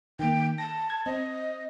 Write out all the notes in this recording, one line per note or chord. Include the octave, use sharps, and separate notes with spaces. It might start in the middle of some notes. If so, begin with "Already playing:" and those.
D#3 A#3 G5
A5 A#6
A5 G#6
C4 D#5